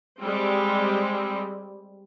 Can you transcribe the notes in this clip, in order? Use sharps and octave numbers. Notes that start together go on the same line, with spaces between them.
G3 G#3 C4